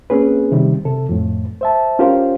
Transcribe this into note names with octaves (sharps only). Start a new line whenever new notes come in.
A#3 C4 C#4 G#4 B4
C3 D#3 G3
C3 A4
F2 A2
C5 E5 A5
C#4 F4 G4 A#4 C5 F5